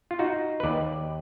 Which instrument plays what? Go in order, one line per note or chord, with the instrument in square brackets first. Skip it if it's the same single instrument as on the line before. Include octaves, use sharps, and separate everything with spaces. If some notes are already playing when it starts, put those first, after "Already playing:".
[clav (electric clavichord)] F4
D#4 F#4
B4
D#2 D5